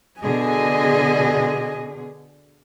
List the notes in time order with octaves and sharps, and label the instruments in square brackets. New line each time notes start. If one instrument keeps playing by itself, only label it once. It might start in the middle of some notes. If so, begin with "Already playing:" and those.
[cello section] B2 D3 G#4 [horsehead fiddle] D#5 G#5